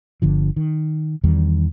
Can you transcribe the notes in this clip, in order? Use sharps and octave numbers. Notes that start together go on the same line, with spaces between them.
G1 D3 F3
D#3
E2 D#3 G3